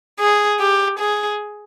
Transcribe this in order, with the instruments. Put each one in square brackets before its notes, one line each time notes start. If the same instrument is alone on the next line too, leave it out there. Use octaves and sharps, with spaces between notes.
[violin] G#4
G4
G#4